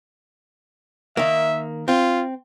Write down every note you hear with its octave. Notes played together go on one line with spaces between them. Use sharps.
D#3 A#3 E5
C4 F4